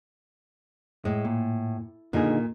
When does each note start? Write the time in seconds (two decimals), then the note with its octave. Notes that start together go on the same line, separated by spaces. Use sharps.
1.05 A2 G#3
1.25 A#2
2.13 A#2 D3 D#3 D#4 G#4